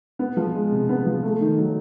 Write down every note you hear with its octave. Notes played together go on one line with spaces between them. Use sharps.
B3
F3
G#3
C3
B3
F3
A3
D#3
F#3